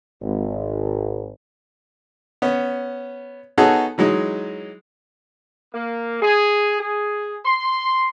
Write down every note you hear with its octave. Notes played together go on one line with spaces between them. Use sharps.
G#1
B3 C#4
B3 D#4 F#4 G#4 A4 C#5
E3 F#3 G#3 D#4
A#3
G#4
G#4
C6